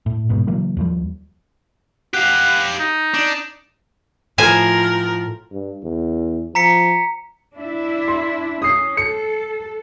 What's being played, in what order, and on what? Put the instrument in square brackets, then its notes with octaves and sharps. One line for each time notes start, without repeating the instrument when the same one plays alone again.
[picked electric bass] A2
A1 G#2 B2
C#3 E3 F#3 A#3
D#2 F3 G3
[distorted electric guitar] G4 F5 [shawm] F#5
[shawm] D#4
[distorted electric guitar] D4
[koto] A2 C5 G#5 [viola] F3 A#4
[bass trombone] G2
E2
[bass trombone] F3 [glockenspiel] A#5 B6 C#7
[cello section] D4 E4 E5
[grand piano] C6
[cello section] C#4 [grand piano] D#6 C7
[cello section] A4 [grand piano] C#7